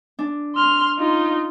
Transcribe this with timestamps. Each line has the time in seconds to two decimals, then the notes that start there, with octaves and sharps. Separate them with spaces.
0.19 D4
0.55 C6 F6
0.98 D#4 F4